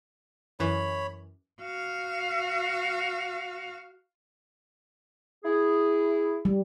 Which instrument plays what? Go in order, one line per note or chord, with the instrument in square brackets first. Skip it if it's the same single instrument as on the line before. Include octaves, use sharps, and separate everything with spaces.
[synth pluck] F#2 E3 [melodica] C#5 B5
[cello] F#4 F5
[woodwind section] E4 G#4
[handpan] G3